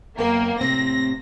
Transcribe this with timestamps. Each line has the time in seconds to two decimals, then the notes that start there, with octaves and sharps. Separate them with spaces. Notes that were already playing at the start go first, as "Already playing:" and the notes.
0.18 F#2 A#3 B3 G5
0.61 A2 C3 C4 A#6